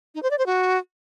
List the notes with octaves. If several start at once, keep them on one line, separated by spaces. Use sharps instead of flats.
D#4
C5
D5
C5
F#4